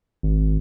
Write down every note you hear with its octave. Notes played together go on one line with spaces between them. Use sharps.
G#1